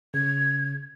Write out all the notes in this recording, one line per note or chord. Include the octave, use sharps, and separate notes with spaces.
C#3 G#6